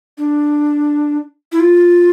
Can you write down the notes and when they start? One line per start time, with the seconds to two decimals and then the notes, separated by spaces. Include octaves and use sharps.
0.18 D4
1.52 E4
1.60 F4